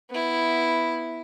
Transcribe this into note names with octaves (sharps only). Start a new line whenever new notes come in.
B3 E4